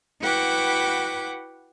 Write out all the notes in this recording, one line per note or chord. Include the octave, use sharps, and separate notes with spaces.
E4 F#4 B4 F#5 G5 D6